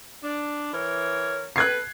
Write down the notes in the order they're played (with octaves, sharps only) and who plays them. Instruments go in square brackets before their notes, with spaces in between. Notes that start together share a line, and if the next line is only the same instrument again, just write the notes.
[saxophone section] D4
E3 A#4 C#5
[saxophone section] A4 B4 [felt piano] F#6 G#6 C7